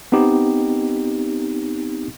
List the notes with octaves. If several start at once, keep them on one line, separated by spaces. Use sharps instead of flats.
B3 C4 D#4 G4